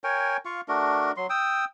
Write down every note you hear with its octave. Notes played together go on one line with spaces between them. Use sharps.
A#4 C#5 G5 G#5
F4 F5 C#6
A3 D4 F#4 A#4
F#3 C6
G5 D#6 E6